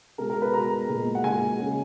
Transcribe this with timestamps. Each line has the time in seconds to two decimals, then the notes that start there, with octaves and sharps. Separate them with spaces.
0.18 B2 G#3 A#4
0.30 A#4
0.42 B4
0.54 B2 G#3 A#5
0.89 A#2 G#3
1.15 F#5
1.23 A#2 G#3 G#5
1.58 C#3 G#3